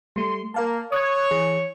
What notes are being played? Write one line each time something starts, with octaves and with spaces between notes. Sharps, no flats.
G3 A3 C6
A#3 A#4 F5 A5
C#5 D#6 F#6 G#6
E3 G#4